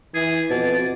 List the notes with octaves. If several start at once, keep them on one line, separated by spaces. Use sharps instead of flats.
E3 G#4
F2 B2 D5